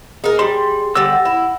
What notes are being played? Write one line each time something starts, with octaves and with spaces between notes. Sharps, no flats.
D#4 G#4 A#4
G3 C6
D3 G3 E6 A#6
F#5
E4